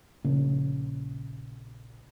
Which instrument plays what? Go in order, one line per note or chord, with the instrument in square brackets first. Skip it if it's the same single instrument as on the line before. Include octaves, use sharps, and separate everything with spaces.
[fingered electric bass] A#1 C#3 A#3 C#4